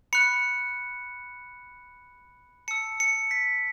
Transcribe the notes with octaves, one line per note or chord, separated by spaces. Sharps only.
B5 F#6 C#7
A5 E6 C#7
C#7
B6